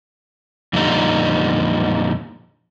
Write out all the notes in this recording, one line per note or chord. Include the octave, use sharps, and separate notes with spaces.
F2 A#2 D3 G3 D#4